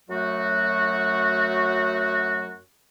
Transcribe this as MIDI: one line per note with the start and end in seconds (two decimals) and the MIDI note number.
0.10 2.60 42
0.10 2.60 54
0.10 2.60 57
0.10 2.60 66